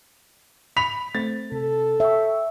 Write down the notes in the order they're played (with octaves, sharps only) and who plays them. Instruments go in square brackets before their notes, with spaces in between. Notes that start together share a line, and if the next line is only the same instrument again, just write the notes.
[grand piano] B5 B6 F7
[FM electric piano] A3 C4 [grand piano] A6
[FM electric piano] C3 [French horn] A4
[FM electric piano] C#5 G5 C#6 [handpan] E5